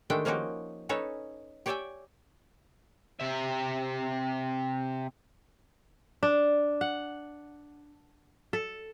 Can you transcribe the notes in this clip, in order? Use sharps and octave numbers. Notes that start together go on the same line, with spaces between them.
D#3 G#3 A3 D4 G4 G5
F3 A#3 C#4 D#4 F#4 G4
C#4 D#4 A4 B4 C#5
G4 C#5 D5 E5 G5 G#5
C3 E5
D4
F#5
A4